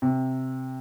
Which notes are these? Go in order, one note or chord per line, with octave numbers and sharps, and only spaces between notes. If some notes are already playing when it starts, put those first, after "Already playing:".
C3